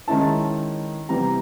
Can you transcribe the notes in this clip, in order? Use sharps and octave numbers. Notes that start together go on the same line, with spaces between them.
D#3 G#3 C#4 E4 A5
C3 E3 G3 B3 A#5